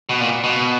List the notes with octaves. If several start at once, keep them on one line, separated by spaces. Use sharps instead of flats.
B2
A#2
B2